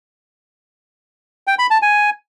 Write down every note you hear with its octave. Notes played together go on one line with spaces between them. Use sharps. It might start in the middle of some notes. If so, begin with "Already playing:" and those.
G5
B5
A5
G#5